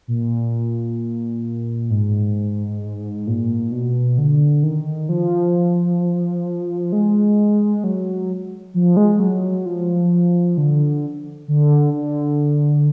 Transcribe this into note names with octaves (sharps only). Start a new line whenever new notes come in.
A#2
G#2
A#2
B2
D3
D#3
F3
G#3
F#3
F3
G#3
F#3
F3
D3
D3
D3